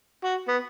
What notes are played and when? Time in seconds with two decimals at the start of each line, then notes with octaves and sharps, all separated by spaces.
0.24 F#4
0.48 B3